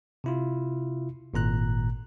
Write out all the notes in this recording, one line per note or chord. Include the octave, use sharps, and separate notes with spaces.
C3 E4 F4
G#1 A#2 A#5 F#6